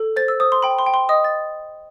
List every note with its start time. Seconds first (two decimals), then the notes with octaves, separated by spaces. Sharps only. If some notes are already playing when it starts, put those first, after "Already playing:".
Already playing: A4
0.16 C5 A6
0.28 E6
0.40 C5 D#6
0.52 C6
0.63 G5 B5
0.79 C6
0.86 G5
0.94 C6
1.09 D#5 D#6
1.24 A6